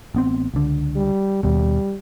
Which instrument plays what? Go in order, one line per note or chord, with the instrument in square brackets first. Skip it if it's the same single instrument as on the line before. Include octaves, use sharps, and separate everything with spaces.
[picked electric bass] A1 B3 C4
C#2 D3
[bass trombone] G3
[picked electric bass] D#2 B2 [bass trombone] G3